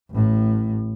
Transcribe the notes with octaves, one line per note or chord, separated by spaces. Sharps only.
A1 A2